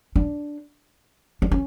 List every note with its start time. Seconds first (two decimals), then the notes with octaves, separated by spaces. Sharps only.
0.16 D4
1.42 D4
1.51 C#4